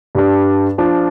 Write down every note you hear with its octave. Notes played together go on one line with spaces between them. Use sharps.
G2 G3 D4
F3 D4 F4